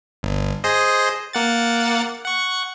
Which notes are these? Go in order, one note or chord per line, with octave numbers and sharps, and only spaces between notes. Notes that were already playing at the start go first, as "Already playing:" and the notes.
G1
G#4 C5 D#5
A#3 F#5 A6
F#5 C#6